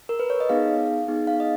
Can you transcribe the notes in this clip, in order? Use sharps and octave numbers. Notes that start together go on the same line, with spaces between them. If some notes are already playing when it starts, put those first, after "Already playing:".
A#4
B4
C#5
D#5
B3 D#4 G#4 F5
B3 D#4 G#4
F5
D#5